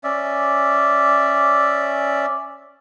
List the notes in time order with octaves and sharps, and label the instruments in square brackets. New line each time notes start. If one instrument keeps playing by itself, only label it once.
[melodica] C#4 D5 E5